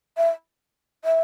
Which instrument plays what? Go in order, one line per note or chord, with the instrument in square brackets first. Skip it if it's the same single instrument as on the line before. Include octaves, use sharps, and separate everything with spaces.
[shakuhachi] E5
E5